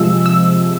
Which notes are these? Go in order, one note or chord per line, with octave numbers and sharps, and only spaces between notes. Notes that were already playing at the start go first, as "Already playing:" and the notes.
Already playing: C3 F3 G#3 E6
E6